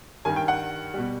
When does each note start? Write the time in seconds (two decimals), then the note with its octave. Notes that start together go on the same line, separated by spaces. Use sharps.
0.25 G2 D#3 G3 G#5
0.36 G5
0.48 F#5
0.94 B2 G3